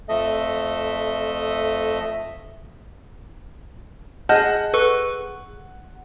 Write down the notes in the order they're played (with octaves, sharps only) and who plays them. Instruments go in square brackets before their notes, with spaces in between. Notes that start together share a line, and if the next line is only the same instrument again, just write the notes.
[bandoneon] F2 A3 A4 D#5 E5
[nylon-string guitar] G#4 D#5 [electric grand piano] F#5 [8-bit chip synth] A5 F6 G6
[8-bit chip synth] A4 B4 C#6